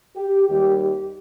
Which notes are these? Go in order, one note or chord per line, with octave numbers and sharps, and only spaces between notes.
G4
D#2 D#3 G3 G4
G4